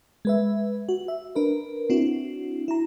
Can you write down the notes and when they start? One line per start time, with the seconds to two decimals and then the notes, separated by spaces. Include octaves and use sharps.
0.25 G#3 B4 E5
0.89 F#4
1.08 E5
1.35 D4 A#4 B4
1.90 C4 D4 E4 F#4
2.68 E4 A#5